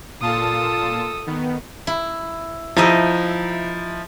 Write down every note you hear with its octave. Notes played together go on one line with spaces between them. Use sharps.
A#2 F4 A4 A5 D#6
D#3 B3
E4
F3 D#4 E4 D#5 E5